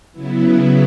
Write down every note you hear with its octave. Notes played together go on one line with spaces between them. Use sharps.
C#3 F#3 B3 E4